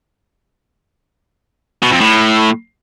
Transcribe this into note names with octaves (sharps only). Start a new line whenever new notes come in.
B2
F2
A2